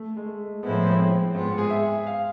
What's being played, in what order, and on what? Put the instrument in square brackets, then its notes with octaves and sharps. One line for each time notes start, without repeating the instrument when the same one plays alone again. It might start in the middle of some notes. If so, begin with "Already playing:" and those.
Already playing: [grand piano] A3
G#3
A3
[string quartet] A2 F3 G#3 C4 E4 [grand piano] B3
[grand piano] C4
[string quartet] G#2 G#3 B3 F4 [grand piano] C4
[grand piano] G#4
E5
F5